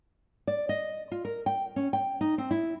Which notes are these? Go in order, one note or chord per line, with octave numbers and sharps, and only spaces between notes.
D5
D#5
F4
A#4
G5
C#4
G5
D#4
C4
E4